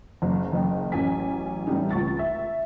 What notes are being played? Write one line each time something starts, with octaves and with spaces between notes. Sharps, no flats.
F#1
F#1 D#5 G5
A1 F#2 C#4 G#5 B6
A2 E3 G3 D#4
C#2 C#6 A6
E5